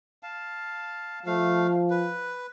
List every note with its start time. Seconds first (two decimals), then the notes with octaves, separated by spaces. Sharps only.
0.23 F5 A5
1.26 F3 A3 F5
1.90 B4